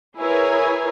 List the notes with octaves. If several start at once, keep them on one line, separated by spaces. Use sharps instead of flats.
E4 G#4 A#4 B4 C#5 G#5